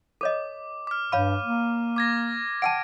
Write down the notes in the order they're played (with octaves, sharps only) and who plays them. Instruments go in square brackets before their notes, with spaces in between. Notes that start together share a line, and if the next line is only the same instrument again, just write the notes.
[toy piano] A4 C#5 D#5 [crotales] D6
[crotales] D6 F6
[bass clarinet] G2 [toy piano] C#5 F5 B5 [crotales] D#7
[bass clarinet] A#3
[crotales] D6 G#6 A#6
[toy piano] F#5 G5 A5 [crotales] D7